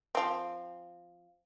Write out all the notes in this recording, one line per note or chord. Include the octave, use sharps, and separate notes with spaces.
F3 C4